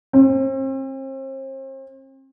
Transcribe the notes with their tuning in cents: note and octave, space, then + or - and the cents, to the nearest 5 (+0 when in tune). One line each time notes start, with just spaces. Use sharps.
C4 +40